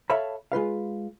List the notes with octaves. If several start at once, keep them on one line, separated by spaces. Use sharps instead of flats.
A4 C#5 E5 F5 A5 B5
G#3 F4 B4 F5